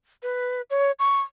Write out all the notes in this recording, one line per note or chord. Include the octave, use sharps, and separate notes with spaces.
B4
C#5
C#6